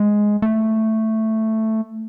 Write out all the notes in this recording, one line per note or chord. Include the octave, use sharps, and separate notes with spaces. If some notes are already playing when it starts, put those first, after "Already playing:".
Already playing: G#3
A3